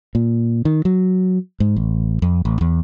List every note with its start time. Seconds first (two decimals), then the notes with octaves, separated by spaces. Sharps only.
0.15 A#2
0.65 D#3
0.85 F#3
1.60 G#2
1.76 A1
2.22 F2
2.45 A1
2.61 E2